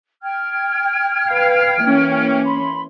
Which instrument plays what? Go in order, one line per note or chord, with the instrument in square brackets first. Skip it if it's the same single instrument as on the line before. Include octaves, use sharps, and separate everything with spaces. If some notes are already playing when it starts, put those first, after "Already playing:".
[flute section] G5 F6 G#6
[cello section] B4 F5
E3 A#3 C#4
[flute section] B5 C6